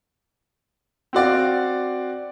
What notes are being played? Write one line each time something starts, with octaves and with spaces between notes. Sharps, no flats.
C4 F#4 D5 F5